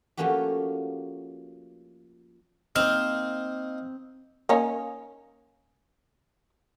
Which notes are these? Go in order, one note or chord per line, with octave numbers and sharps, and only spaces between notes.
F3 A3 A#3 C#4 F#4 G4
A#3 C4 D#4 F6
A#3 C#4 D#4